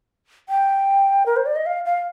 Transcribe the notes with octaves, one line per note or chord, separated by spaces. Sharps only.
G5
A#4
C5
D5
D#5
F5
F5